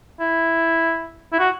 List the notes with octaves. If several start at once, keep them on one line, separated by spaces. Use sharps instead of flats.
E4
E4
F#4